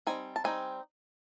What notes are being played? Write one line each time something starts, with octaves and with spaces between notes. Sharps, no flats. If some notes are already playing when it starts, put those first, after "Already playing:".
G3 C4 D#4 G#5
A5
G3 C4 D#4 G#5